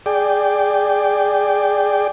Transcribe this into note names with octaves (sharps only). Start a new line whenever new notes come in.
G#4 D5 G5